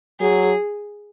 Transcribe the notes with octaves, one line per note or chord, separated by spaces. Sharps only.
F#3 G#4